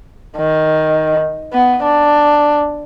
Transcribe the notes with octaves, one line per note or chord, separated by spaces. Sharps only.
D#3
B3
D4